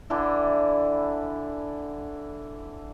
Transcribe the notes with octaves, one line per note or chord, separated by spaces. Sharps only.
D3 E3 D4 E4